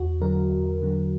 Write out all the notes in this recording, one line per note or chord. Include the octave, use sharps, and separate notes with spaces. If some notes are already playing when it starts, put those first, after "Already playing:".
Already playing: E2 F#4
D3 F#3 A#4
E2
D3 F#3